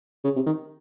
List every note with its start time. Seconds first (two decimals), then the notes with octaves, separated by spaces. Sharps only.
0.24 C#3
0.36 C3
0.46 D#3